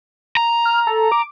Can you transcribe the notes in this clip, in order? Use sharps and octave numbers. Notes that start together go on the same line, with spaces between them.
A#5
F6
A4
D6